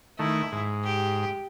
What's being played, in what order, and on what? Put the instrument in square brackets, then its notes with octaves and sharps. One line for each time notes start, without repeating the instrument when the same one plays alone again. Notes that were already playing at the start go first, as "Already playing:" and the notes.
[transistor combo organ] D#3 A3 [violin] E4
[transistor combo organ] G#2
[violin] G4